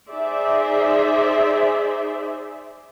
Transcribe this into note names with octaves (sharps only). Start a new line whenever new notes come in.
D#4 G#4 C5 D5 E5